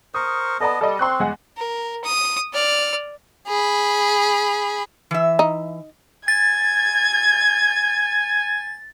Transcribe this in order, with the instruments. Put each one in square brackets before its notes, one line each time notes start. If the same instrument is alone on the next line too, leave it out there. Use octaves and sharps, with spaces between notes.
[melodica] A#4 C5 C#6 [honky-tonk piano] D#6
[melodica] B3 D#5 [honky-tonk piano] A4 D5 A5
[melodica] G3 [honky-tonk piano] A4 D5 D#5
[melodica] C4 [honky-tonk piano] C6 C#6 F#6
[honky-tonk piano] E2 G#3 F#5
[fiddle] A#4
D#6
D5 F6
[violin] G#4 B5
[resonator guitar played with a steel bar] E3 E5
[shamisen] D#4
[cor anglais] G#5 [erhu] G#6 [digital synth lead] A6